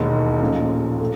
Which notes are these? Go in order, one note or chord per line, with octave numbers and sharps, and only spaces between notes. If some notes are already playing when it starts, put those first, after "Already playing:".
Already playing: E1 D#2 D#3
A#1 A#2 F3 A3 C#4
A3